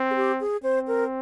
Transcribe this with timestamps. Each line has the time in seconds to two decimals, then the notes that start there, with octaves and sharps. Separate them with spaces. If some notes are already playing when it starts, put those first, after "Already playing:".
Already playing: C4
0.11 G#4
0.16 G4
0.40 G#4
0.63 C4 C5
0.88 A#4